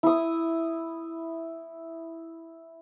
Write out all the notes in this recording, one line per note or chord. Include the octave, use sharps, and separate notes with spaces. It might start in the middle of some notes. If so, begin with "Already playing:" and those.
E4 D#6